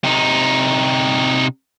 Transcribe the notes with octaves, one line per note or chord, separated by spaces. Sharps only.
C3 D#4